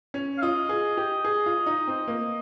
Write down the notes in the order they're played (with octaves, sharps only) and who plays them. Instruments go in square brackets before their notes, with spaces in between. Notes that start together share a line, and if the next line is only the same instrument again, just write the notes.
[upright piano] C#4
[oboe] F5
[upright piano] F4 [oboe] D#5
[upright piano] G#4
G4
G#4
F4
D#4
C4
A#3